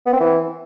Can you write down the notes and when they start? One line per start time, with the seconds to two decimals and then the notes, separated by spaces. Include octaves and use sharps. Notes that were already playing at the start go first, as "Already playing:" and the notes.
0.06 B3
0.13 C4
0.20 E3